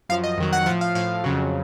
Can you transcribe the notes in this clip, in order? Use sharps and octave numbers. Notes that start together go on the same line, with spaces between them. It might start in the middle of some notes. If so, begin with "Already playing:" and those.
F#2 F3 F5
D#5
F2 D#3 F#3
F#5
A2 F3 F#5
F5
A2 F3 F5
F2 C#3 F#3